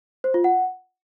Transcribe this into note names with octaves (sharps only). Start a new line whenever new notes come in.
C5
F4
F#5